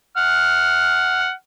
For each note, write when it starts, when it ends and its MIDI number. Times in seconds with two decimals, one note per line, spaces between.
0.17 1.31 78
0.17 1.31 89